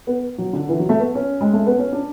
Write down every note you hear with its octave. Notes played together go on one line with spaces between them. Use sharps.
B3
F#3
D3
E3
F#3
A3
B3
C#4
G#3
A3
B3
C#4
D4